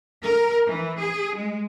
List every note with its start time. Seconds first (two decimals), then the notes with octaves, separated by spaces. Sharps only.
0.23 A#4
0.66 E3
0.99 G#4
1.36 G#3